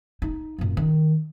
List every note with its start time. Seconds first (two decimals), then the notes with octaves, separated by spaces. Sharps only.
0.22 D#4
0.58 F#2 A#2
0.77 D#3